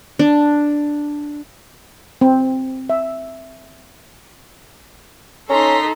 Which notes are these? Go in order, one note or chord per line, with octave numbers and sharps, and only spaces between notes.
D4
C4
E5
C#4 D#4 A4 A#5 C6 B6